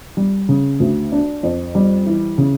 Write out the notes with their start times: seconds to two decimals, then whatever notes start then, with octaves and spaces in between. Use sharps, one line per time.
0.17 G3
0.49 C#3
0.80 D2
1.12 D4
1.43 F2
1.75 G3
2.06 E3
2.38 C#3